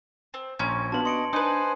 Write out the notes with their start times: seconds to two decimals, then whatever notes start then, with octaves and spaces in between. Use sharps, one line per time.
0.34 C4
0.59 A#1 C#4 A#5 C6 G#6
0.92 B3 D4 F4 F#4 A5 F#7
1.05 D#5 C6 C#7 D7
1.33 D4 D#4 B4 C5 G#5 D#6